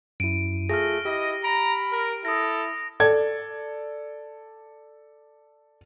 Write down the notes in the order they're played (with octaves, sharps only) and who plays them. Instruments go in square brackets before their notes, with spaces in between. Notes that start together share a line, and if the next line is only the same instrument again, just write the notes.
[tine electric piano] F#2 E4 [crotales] D7 D#7
[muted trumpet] A3 [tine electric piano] F4 G#4 [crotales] F6 A#6
[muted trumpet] E4 [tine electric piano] G4 [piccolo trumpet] D#5
[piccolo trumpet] A#5 [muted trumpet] B5 [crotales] D7
[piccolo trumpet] A#4
[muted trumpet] E4 [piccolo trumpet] A4 [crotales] D#6 A#6
[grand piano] A4 D5 G#6